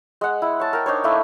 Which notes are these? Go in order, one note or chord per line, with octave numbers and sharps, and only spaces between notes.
G#3 F#5
E4
C#5 A5
A#4 G5
D4 D#4 C5 C#5
A3 A#3 D4 E4